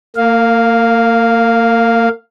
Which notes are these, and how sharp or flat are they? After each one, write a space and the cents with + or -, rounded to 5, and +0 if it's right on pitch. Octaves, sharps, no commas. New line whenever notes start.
A#3 -35 F5 +0